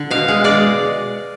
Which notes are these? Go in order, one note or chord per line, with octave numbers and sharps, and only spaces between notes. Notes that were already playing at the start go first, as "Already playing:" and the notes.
Already playing: D3
B2 F5
G#3
G#3 D5